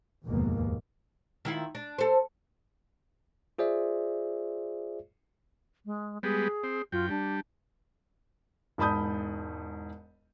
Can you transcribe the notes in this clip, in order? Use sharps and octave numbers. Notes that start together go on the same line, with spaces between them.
F1 D#2 G#2 B2 A#3
D#3 E4 F4
D4
A4 C5
F4 G#4 C5 D5 E5
G#3
G3 G#3 B3 G#4
C4
F#2 F4 G5
G3 D4
E1 G#2 A5 B5 D#6 G6